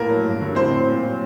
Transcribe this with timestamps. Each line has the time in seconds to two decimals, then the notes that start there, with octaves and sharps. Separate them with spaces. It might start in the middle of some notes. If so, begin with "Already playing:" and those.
Already playing: A2 A#3 A#4
0.09 F#3
0.24 G2
0.40 D3 F#3
0.55 A2 C4 C5
0.72 F#3
0.88 A#2
1.03 F#3